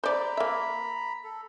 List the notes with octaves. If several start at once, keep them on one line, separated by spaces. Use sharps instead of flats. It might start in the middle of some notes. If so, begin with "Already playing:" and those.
C5 D5 A#5 B5
A#3 E5
A4